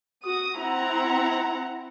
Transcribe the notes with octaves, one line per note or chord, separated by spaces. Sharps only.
F#4 D#6
C4 E4 F#5 A#5